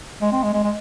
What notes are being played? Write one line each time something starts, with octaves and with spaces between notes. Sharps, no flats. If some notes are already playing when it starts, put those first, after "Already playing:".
G#3
C4
G#3
G#3
G#3